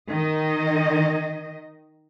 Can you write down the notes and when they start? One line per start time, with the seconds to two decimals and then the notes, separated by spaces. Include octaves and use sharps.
0.10 D#3 D#5